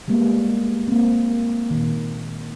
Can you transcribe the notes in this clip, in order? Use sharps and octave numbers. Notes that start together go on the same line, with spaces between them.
G3 G#3 A#3 B3
A#3 C4
A#2 D#3